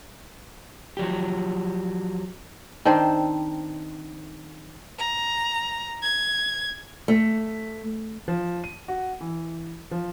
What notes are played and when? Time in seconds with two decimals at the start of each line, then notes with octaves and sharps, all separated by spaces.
0.97 F3 F#3 G4
2.85 D#3 C4 D4 C5
4.99 A#5
6.02 G#6
7.08 A3
8.28 F3
8.64 D#7
8.88 F#4
9.21 E3
9.91 F3